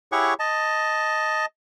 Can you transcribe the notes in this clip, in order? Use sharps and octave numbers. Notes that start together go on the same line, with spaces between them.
E4 G4 G#4 C#5 F#5 C#6
D#5 A5